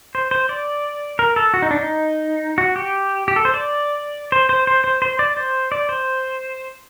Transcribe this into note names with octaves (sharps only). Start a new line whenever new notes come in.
C5
C5
D5
A#4
A4
F#4
D#4
D4
D#4
F#4
G4
G4
A4
C5
D5
C5
C5
C5
C5
C5
D5
C5
D5
C5